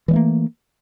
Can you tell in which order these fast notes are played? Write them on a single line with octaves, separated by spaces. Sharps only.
E3 G3 A3 A#3